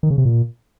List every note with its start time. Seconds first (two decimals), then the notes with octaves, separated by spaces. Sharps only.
0.03 D#3
0.10 C#3
0.18 C3
0.25 A#2